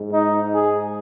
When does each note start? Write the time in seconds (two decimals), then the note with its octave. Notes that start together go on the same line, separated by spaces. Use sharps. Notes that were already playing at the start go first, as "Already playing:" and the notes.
Already playing: G#2 G#3
0.12 D#4
0.52 G#4